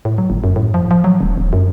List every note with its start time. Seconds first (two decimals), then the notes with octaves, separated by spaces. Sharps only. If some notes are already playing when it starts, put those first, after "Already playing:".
0.05 A2
0.18 F#3
0.30 G1
0.44 F#2
0.56 A2
0.74 F3
0.91 F3
1.04 F#3
1.21 D#1
1.38 D#1
1.53 F#2